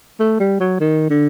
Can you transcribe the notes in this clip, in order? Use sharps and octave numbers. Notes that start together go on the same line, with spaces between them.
A3
G3
F#3
D#3
D3